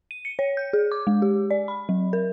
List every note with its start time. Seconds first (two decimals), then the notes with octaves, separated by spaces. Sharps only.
0.11 D#7
0.25 C#7
0.39 C#5
0.57 G6
0.73 G#4
0.92 D6
1.07 G#3
1.22 G4
1.51 D5
1.68 B5
1.89 F#3
2.13 A#4